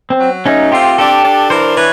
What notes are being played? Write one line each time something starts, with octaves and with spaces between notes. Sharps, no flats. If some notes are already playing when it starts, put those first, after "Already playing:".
C4
F#3
A3 C#4 D#4
C4 F4 G4
D4 G4 A4
D4
E3 A#4 C5
E3 B4 C#5